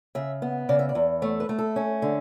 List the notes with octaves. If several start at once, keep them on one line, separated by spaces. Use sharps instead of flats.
C#3 E5
B3
C#3 D5
E5
D5
E2
A3 C#5
B4
A3
A4
C#4
D3